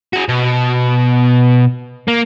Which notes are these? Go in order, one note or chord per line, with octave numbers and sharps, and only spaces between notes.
F#4 G#4
B2
A#3